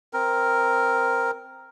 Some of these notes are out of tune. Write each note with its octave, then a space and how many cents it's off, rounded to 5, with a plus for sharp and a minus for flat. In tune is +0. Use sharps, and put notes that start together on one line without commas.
C4 +0 A#4 +0